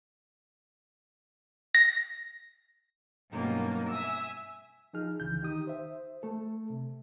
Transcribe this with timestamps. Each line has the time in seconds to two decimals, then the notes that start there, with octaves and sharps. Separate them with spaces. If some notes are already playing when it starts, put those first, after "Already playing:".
1.75 A#6
3.30 G2 B2 F#3 A#3 C#4 D#4
3.88 E5 G#5 D#6 E6
4.93 F3 D#4 G#4 F6
5.20 C#2 C#3 E3 G6
5.42 D#3 D#4 G4 D#6
5.67 C5 E5
6.23 A3 A4
6.70 C3